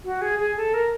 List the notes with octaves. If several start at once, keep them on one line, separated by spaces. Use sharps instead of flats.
F#4
G#4
G#4
A4
A#4